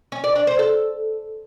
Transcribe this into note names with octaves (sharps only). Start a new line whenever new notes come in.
C#4
D5
D4
C5
A4